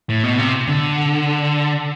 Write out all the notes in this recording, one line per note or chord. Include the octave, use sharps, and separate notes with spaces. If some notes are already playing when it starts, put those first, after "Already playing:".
A2
B2
C3
D3